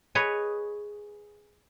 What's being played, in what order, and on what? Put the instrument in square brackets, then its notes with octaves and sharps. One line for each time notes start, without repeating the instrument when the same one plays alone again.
[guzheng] G#4 B4 C#5 D#5